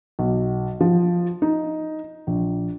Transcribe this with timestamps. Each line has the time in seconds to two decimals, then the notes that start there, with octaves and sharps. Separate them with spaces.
0.19 B1
0.81 F3
1.42 D#4
2.27 A#1